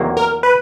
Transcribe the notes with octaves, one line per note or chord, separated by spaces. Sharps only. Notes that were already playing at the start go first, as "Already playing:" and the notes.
Already playing: E2 C3 D#3 F#3 A#3
A#4
B4